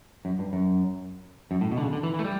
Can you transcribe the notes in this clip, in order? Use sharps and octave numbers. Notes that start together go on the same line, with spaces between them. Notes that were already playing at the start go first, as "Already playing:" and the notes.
F#2
G2
F#2
F#2
A2
B2
D3
C#3
D3
E3
E3
A3
G3